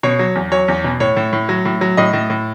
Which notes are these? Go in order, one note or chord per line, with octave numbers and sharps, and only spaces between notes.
B2 C#5
F#3
E2
F#3 C#5
E2
B2
A2 C#5
A2
A2
F#3
A2
F#3
A2 D#5
A2
A2